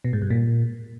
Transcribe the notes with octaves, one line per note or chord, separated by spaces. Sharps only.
B2
G#2
G2
A#2